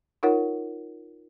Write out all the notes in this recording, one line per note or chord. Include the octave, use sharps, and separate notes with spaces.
D#4 F4 A#4 C#5 F#5